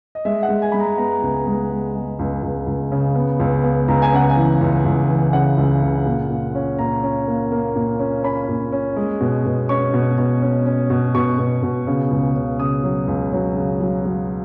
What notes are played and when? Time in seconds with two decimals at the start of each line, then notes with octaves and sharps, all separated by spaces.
0.15 D#5
0.25 G#3 E5
0.43 F#5
0.49 G#3
0.62 G#5
0.72 G#3 B5
0.80 A#5
0.98 B3 A#5
1.22 C#2
1.46 G#3
1.70 G#3
1.95 G#3
2.19 C#2
2.43 C#2
2.67 C#2
2.92 C#3
3.15 B3
3.40 C#2
3.64 B3
3.88 C#2 A#5
4.02 G#5
4.12 C#3 F#5
4.30 G#5
4.37 E3
4.61 C#2
4.85 C#2
5.09 E3
5.33 C#3 F#5
5.57 C#2
5.82 C#3
6.06 A#2
6.30 A#2
6.55 C#4
6.79 A#2 A#5
7.03 C#4
7.27 A#3
7.52 A#3
7.76 A#2
7.99 C#4
8.24 C#4 B5
8.49 A#2
8.72 C#4
8.96 G#3
9.20 B2
9.45 B2
9.69 C#4 C#6
9.93 B2
10.18 B2
10.42 C#4
10.66 C#4
10.90 B2
11.15 B2 C#6
11.39 B2
11.63 B2
11.87 C#3
12.11 C#2
12.36 C#3
12.59 C#3 D#6
12.84 F#3
13.08 C#2
13.32 F#3
13.56 C#3
13.81 F#3
14.05 F#3